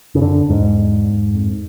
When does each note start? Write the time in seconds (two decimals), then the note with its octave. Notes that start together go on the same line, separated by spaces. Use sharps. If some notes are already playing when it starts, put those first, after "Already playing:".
0.15 F2 C#3
0.22 F#2 D3
0.50 E2 G#2
1.34 F2